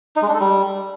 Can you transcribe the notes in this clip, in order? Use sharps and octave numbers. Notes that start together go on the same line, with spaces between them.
D#4
G#3
D4
A4
G3